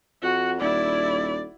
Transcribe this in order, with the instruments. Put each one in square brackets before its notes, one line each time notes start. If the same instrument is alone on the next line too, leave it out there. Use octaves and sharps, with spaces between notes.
[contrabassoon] F2 [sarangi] F#4
[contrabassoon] D#1 [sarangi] E4 [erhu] D5